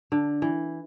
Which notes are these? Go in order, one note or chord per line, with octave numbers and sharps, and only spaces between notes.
D3
E3